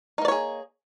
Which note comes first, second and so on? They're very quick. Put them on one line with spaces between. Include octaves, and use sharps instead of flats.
D#4 A#3 D5 C#5 G#4